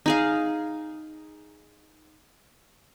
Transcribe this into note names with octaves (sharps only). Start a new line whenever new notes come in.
D#4 G#4 F5